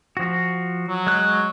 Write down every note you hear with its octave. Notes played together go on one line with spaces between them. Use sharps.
F3 F#4
F#3
G#3 F#6